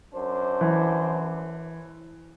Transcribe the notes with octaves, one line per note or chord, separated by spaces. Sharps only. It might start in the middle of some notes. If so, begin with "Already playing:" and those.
F#2 D4 C5
E3